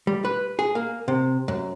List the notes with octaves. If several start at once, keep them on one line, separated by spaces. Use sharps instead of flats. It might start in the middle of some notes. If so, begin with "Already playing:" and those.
G3
B4
G#4
A#3
C3
F#2